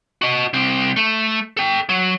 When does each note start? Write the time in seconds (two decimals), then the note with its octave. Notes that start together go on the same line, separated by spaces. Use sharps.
0.22 F#4 D#5
0.53 C2 C4
0.96 A3
1.57 A4 G5
1.89 F#3